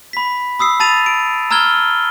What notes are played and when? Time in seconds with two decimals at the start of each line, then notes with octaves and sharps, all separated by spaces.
0.13 B5 B6
0.59 B5 D#6 E6 C7
0.80 A5 B5 A6 D#7 F7
1.06 D7
1.51 A#5 E6 F6 G#6 G7